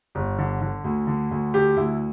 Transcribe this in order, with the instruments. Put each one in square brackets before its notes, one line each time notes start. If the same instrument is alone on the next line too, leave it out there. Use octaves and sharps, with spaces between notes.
[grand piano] G1
D3
D3
D2
D3
D2
D3 G4
D2 E4